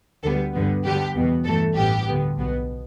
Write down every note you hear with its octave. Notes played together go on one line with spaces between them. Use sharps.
D2 D3 G3 B3 A4
G2 D3 G3 B3
G2 D3 G3 B3 G4
E2 B2 B3
G2 E3 A3 A4
A1 G2 G3 B3 G4
D2 D3 B3
B1 B2 B3